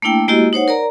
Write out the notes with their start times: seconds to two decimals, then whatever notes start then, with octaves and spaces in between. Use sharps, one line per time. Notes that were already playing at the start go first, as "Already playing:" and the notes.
0.02 A3 A#3 D4 E4 G5
0.28 G#3 A#3 E4 F#4 G4 D#5
0.53 D#4 C5 C#5 F#5
0.68 A#4 D5 A#5